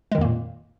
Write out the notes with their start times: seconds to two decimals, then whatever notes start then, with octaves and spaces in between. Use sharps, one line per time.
0.12 G#3
0.15 D#3
0.18 F2
0.21 A#3
0.25 A#2